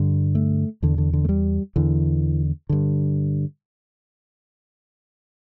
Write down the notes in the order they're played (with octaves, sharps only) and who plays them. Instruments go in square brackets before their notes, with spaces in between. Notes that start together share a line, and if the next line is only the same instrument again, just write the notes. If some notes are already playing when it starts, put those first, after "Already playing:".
Already playing: [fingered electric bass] G2 D3
A3
E2 D3
D3
D3
A3
G3
E2 D3 E3
G2 D3